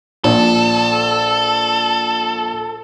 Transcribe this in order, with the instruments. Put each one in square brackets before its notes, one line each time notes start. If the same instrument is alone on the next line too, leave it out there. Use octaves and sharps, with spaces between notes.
[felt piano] A#1 [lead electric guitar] A4